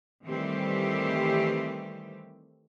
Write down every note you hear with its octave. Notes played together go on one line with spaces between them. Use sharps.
D#3 E3 G3 A3 C4 G4